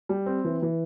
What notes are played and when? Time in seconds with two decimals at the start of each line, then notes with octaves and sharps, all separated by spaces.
0.09 G3
0.26 C4
0.45 E3
0.62 E3